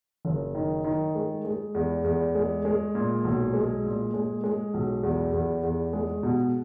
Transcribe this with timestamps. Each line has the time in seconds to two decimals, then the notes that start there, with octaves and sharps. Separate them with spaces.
0.25 F#1
0.55 D#3
0.84 D#3
1.15 G#3
1.45 G#3
1.75 E2
2.04 E2
2.35 G#3
2.65 G#3
2.95 A#2
3.24 B1
3.53 G#3
3.85 A#2
4.14 G#3
4.44 G#3
4.74 B1
5.03 E2
5.33 E2
5.63 E2
5.93 G#3
6.23 B2